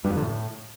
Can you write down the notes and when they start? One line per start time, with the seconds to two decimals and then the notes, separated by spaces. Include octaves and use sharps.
0.05 G2
0.10 F2
0.16 D3
0.22 A2